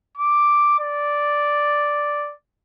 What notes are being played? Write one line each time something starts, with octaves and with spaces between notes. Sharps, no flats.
D6
D5